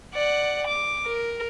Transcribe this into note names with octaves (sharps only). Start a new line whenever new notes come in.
D5 F#5
D6
A#4